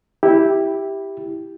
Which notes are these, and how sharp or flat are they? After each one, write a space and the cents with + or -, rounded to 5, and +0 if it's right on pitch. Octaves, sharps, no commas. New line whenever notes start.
E4 -5 G4 +0